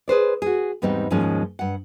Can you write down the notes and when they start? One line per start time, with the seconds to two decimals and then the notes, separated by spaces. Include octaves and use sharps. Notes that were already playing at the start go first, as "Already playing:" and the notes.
0.08 G#4 B4 C5 D5
0.42 F#4 G#4
0.82 E2 G#2 G3 B3 C4 D#4
1.11 D#2 G#2 F3 G#3 C#4 D#4
1.59 G2 F#5